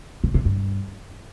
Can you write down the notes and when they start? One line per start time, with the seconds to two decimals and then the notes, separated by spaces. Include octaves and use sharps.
0.24 C3
0.34 C3
0.45 G2